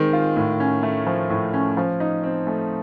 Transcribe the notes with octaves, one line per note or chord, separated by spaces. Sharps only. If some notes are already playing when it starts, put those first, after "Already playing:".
Already playing: D#3 G#3 C4
F4
A2
C#4
A3
F3
A2
C#4
F3
D#4
C4
A3